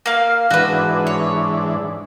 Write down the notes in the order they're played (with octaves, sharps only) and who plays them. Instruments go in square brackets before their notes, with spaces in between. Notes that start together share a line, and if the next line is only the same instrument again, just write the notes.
[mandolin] A#3 F5
[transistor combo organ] G#2 E3 D4 [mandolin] F#4 B4
[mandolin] C#5